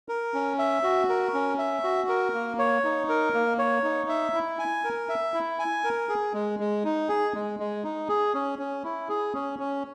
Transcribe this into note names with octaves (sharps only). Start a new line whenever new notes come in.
A#4
C#4
E5
F#4
A#4
C#4
E5
F#4
A#4
A#3
C#5
D#4
A#4
A#3
C#5
D#4
E5
E4
G#5
A#4
E5
E4
G#5
A#4
G#4
G#3
G#3
D#4
G#4
G#3
G#3
D#4
G#4
C#4
C#4
E4
G#4
C#4
C#4